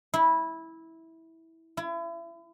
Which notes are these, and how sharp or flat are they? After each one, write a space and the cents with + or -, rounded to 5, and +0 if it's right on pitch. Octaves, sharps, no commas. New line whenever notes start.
E4 -15
E4 +35